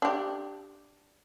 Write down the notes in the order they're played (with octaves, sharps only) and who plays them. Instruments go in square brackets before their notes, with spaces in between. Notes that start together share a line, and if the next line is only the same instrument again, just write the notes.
[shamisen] D4 G4